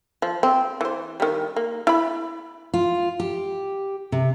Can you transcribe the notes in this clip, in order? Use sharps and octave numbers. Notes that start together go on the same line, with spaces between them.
F3
C4
E3 C5
D#3 G3
A#3
E4 B5
F4
G4
C3